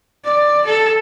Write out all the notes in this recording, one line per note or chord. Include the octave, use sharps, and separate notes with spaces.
D5
A4